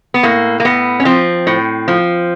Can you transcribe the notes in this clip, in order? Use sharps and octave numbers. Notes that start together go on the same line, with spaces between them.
B3
A2 A#3
A#3
A2 B3
C#4
F3 C4
A2
F3